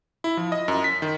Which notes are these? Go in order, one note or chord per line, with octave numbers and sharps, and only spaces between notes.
E4
F3
D#5
F#2
B6
D#3